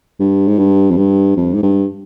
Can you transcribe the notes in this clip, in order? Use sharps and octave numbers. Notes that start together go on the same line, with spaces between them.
G2
G#2
G2
F2
G2
F2
G#2
G2